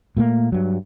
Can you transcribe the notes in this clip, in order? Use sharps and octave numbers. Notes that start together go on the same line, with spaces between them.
A#2 A3 A#3
G2 F#3